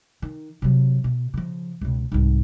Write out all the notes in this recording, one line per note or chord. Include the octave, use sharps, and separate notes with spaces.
D#3
C3 F#3
B2
C#3 F3
C#2 B2
C2 G#2